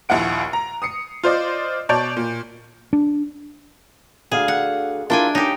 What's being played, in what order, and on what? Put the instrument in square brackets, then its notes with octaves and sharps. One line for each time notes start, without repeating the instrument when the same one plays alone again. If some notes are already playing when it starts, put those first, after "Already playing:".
[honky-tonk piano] A#1 D#2 E4 F#5 D7
A#5
D#6 C7 C#7
F4 C5 D5 D#5
B2 C#5 D5 A5 G6 D7
A#2
[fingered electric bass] D4
[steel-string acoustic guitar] D2 D3 F5 [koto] G#4
[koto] F#5
[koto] D4 G5 G#5 [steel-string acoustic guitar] E4 F4 A#4
[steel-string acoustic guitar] C#4 [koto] D#4 G4